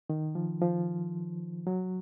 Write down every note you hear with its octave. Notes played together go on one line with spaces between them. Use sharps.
D#3
F3
F3
F#3